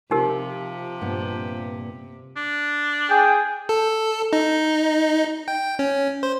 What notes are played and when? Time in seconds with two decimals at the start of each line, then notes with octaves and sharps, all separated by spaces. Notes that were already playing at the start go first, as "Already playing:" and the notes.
0.11 C3 F3 D#4 G4 A#4
1.01 G2 A#2 B3
2.37 D4
3.10 G#4 G5
3.69 A4
4.33 D#4
5.48 G5
5.79 C#4
6.23 C5